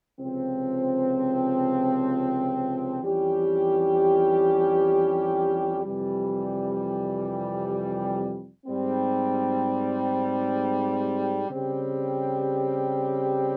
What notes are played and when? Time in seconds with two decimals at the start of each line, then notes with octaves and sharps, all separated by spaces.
0.19 C#2 C3 F3 C4
3.02 F2 E3 G3 C#4 G4
5.84 F2 C3 E3 G3
8.66 G#2 G3 C4
11.48 C#3 G3 C4 G4